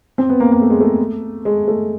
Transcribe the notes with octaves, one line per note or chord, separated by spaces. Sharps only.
C4
B3
A#3
A#3
A3
G#3
A3
G#3
A3